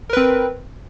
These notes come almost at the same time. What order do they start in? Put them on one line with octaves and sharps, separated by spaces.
A#4 B4 C4